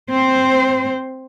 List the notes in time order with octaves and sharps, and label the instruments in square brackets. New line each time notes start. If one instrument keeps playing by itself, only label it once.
[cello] C4 C5